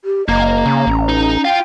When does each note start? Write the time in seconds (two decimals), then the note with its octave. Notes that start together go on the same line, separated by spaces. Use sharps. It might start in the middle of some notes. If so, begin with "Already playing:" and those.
0.05 G4
0.29 F#1 A#3 D#5 A#5
0.66 C#3
0.87 A1 C#4
1.09 D#4
1.45 F4 F5 G5